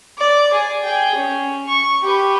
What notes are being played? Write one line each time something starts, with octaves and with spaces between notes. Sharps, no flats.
D5
G#4
G#4 G5
C#4
C#6
G4 B4